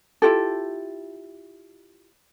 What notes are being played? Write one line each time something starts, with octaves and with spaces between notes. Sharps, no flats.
E4 F4 G4 A4